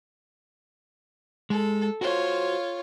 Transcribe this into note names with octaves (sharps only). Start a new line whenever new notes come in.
G#3 A4
F4 F#4 C5 C#5